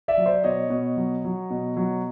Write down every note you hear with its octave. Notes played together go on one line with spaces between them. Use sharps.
D5 E5
F#3
C5 D5
B2 C#5 D#5
B2
F#3
F#3
B2
F#3